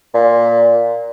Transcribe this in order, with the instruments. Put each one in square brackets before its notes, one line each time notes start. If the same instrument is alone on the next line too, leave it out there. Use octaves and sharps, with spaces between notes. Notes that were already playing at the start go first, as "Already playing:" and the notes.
[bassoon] A#2